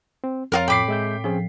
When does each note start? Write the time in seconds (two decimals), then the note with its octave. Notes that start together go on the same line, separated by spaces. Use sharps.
0.24 C4
0.52 F2 C4 F4 F#4 A#4 C#5 A6
0.68 A2 G5 B5 D6 B6 C7
0.88 G#3 E5 G6
1.24 F3 C4 C#4 G#4